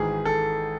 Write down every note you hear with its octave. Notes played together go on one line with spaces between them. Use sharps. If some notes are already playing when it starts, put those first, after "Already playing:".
Already playing: G#1 G#2 E3 G#4
A4